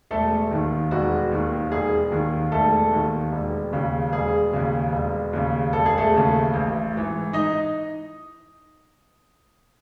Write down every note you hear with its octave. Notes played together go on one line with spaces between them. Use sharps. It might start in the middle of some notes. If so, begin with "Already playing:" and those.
E1 A3 A4
D#2 D#3
E1 F#4
D#2 D#3
E1 G#4
D#2 D#3
E1 A3 A4
D#2 D#3
E1
D#2 C#3
E1 G#4
D#2 C#3
E1
D#2 C#3
E1 A4
G#4
A3 A4
D#2 C#3
A1
G#2 E3
D#4 D#5